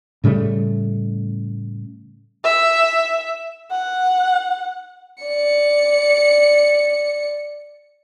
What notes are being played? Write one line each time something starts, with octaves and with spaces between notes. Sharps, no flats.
A2 C#3 G3 A3
E5
F#5
D5 C#7